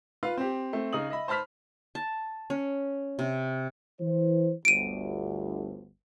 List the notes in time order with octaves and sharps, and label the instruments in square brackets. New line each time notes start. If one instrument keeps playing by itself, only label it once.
[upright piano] F4 B4 F5
C4 G4
A3 C4
C#3 D#4 D#6 F#7
D#5 E5 B5
C5 A5 B5 F6 B6
[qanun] A5
C#4
C3
[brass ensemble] E3 C5
[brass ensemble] G1 D2 [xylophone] D7 D#7